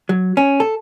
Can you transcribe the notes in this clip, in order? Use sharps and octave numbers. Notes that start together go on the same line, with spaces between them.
F#3
C#4
A4